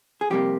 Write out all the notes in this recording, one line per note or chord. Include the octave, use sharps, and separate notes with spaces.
G#4
F2 C3 G3 A#3 G4